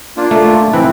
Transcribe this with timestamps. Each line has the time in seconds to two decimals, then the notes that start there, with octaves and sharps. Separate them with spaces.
0.17 A#3 D4 F4
0.31 A3
0.73 E3 C4 E4 B4